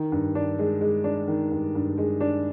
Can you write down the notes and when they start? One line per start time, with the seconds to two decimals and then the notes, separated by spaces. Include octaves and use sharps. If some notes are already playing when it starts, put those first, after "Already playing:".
Already playing: D#3
0.12 G2
0.35 D4
0.59 G#3
0.81 G#3
1.04 D4
1.28 D#3
1.51 G2
1.75 G2
1.98 G#3
2.21 D4